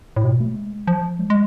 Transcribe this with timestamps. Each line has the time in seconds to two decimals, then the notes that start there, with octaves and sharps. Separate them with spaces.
0.17 A2
0.24 B2
0.40 A3
0.56 G#3
0.88 F3
1.19 G#3
1.30 G#3